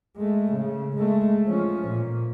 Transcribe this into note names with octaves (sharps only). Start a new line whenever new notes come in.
G#3 A3
C#3
G#3 A3
F3 C#4
A#2